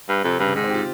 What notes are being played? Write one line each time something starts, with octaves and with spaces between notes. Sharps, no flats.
G2
F2 C3
G2 C#3
G#2 D#3
C4
G4
F4